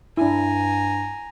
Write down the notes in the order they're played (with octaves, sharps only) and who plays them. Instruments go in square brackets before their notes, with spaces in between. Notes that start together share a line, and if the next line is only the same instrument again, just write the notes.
[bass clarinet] G2 [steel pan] D4 E4 [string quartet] G#5 A#5